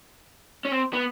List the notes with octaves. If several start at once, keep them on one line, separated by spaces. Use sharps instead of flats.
C#4
C4
B3